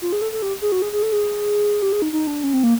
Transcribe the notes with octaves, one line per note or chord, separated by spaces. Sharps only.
F4
G#4
A4
A4
G4
G#4
F#4
G#4
G#4
A4
G#4
G4
G#4
D#4
D#4
D4
C#4
C4
A#3